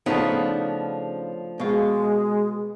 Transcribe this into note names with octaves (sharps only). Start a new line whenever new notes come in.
C#3 F3 A3 B3 D4 D#4
B2 G#3 F5